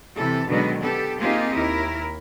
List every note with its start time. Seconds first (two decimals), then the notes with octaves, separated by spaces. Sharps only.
0.17 C3 E3 A4
0.49 B2 D3 D#3 F#3 G#3 B3
0.81 B3 G4 A4
1.21 A#3 C4 D#4 F4 G4 G#4
1.57 D#2 E4 A#4